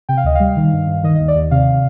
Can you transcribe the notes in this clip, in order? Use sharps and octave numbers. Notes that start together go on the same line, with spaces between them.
C3 G5
F5
D2 D#5
G3 F5
D#3
G2
G2
D#3 D#5
D#5
D#2
D5
D#2
C3 F5